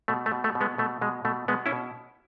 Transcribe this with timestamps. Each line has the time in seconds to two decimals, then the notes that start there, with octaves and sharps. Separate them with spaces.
0.08 B2 A3
0.26 A3
0.32 B2
0.44 A3
0.55 B2
0.61 G#3 B3
0.78 B2 A3
1.01 B2 G#3
1.25 B2 A3
1.48 B2 G#3 B3
1.66 C#4 E4
1.72 B2